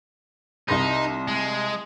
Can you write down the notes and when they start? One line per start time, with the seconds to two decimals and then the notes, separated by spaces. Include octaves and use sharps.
0.69 C2 D#4 C6 A#6
1.28 G#3